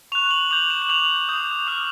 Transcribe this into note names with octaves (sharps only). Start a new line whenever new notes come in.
C#6 F#6 F7
F#7
D6 G6 F7
E7
F#7
D6 G6 F7
D#6 G6
D6 F6